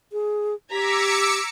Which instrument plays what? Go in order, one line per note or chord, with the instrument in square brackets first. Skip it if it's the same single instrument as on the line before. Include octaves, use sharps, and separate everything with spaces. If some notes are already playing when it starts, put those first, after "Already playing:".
[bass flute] G#4
[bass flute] G4 [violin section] A#5 G#6 B6 [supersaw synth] D6 E6 C#7